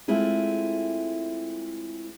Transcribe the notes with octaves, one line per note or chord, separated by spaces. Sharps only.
G#3 A3 C4 E4 F4 G#4